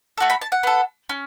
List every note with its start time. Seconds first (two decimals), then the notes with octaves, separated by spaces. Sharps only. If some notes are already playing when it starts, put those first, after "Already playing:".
0.18 A3 F#4 A4
0.30 B5
0.41 A5
0.52 F#5
0.63 B3 A4
1.09 C#4